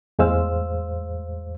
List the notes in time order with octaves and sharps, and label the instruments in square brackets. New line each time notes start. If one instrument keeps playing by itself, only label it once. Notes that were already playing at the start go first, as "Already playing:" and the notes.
[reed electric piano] E2 A2 G#3 C5 F5 E6